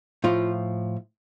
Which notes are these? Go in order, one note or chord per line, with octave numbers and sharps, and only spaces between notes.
A2 F3 F4